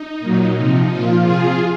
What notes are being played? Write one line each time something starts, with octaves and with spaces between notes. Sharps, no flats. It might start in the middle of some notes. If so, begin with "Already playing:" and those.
Already playing: D#4
A#2 F#3
C3 F3
A#2 F3 F4
C3 F3 F4 G#4